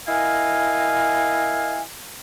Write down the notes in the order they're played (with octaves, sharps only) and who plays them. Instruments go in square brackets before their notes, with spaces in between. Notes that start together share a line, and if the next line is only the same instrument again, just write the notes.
[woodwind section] E4 A#4 D#5 F5 G#5